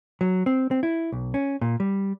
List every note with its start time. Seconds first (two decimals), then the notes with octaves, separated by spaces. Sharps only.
0.21 F#3
0.46 C4
0.71 C4
0.83 E4
1.12 B1
1.34 C#4
1.61 A#2
1.80 G3